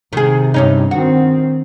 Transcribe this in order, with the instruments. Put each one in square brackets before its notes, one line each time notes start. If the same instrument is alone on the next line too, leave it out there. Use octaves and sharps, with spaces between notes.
[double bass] C3 [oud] D#3 G#4
[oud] G2 C#4 D#4
[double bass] D#3 C4 [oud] F#4